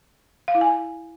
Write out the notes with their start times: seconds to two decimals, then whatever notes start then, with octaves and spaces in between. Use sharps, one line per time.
0.48 F5
0.55 E4
0.61 G#5